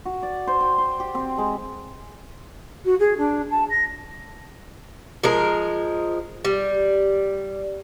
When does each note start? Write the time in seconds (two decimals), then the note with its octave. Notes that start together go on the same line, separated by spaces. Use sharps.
0.06 F#4
0.23 D5
0.47 C5
0.61 G5
0.78 C6
1.00 G4
1.15 C4
1.38 G#3
2.85 F#4
2.99 G#4
3.17 D4
3.50 A5
3.70 A#6
5.24 F3 G#3 A#4
6.45 G3